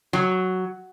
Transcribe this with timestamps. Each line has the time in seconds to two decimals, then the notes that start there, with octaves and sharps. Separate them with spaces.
0.13 F#3